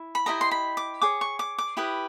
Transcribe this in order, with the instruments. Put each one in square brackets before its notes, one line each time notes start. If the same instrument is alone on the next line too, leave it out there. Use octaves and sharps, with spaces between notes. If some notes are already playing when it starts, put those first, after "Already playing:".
Already playing: [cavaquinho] E4
B5
E4 G4 C5 D#5 A#5
C6
B5
D6
G#4 C#5 D6
C#6
D6
D6
E4 G4 B4 D#6